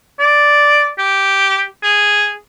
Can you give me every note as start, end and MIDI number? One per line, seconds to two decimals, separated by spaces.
0.20 0.89 74
0.99 1.64 67
1.83 2.32 68